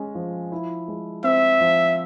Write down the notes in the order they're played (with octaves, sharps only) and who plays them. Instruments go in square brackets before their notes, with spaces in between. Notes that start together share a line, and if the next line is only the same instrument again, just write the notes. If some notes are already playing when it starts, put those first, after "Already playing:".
Already playing: [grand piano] G#3 C#4
F3
E4
G#3
[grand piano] C4 [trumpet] E5
[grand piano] F3